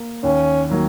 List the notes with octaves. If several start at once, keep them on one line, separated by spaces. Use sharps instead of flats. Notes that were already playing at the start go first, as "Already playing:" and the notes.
Already playing: A#3
D#2 C#4
D#3 F#3 A#3